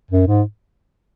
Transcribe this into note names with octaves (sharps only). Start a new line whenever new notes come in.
F#2
G#2